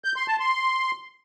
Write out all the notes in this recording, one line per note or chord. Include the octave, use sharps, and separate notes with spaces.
G6
C6
A5
C6